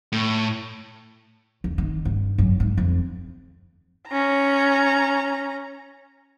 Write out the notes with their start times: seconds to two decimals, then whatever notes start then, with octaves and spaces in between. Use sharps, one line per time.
0.12 A2
1.64 E2
1.78 D#3
2.05 G2
2.38 F#2
2.60 G#2
2.77 F2
4.08 C#4 A#5